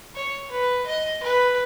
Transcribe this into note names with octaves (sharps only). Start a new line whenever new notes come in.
C#5
B4
D#5
B4